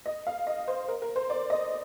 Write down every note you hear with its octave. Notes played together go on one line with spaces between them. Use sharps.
D#5
F5
D#5
C5
A#4
A#4
C5
D5
D#5